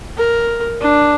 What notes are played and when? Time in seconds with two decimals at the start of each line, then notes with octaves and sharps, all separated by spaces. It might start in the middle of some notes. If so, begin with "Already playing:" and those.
0.18 A#4
0.82 D4